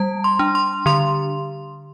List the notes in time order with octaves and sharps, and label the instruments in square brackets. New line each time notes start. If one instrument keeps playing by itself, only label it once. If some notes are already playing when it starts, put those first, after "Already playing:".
Already playing: [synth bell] G3 A5
C6
D4
C6
D3 C6